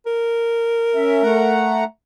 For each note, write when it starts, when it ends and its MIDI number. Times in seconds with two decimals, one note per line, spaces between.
0.06 1.73 70
0.95 1.22 61
0.95 1.22 76
1.22 1.84 57
1.22 1.84 78
1.22 1.84 82